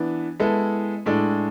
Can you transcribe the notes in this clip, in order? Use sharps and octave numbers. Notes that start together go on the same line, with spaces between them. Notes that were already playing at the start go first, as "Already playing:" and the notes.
Already playing: E3 B3 D4
G#3 B3 E4 A4
A2 G#3 D4 A4